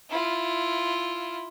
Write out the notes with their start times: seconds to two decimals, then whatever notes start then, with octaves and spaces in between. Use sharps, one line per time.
0.10 E4 F4